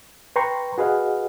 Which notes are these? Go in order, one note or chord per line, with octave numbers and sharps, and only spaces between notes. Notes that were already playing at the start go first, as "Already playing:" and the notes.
B4 G5 A#5 C6 C#6
F#4 G#4 B4 D#5 F5 F#5